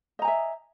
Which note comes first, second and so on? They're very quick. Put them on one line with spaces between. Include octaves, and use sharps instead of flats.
D#5 A#5 G#5 E5